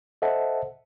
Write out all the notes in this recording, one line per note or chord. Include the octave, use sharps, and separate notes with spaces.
A4 C5 D#5 E5 F#5 A5